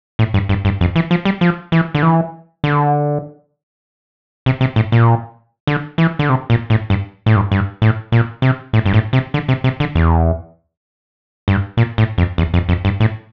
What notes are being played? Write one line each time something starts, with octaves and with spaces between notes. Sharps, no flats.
A2
G2
G2
G2
F2
E3
F3
G3
F3
E3
D3
E3
D3
C3
C3
A2
A#2
D3
E3
D3
C3
A#2
A2
G2
A2
G2
G2
A2
A#2
C3
A2
G2
A2
C3
D3
C3
C3
D3
E2
G2
A#2
A2
F2
E2
F2
F2
G2
A2